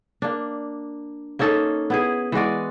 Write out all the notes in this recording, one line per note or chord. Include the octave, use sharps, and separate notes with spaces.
A#3 D4
A#3 C#4 D#4 A4
B3 E4 G#4
E3 G#3 F#4 D5